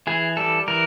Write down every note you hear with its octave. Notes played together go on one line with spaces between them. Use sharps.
E3 G#4
G3 A4
E3 A#4